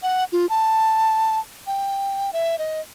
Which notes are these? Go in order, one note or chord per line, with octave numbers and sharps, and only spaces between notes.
F#5
F4
A5
G5
E5
D#5